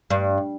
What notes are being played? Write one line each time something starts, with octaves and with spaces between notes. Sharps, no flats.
G2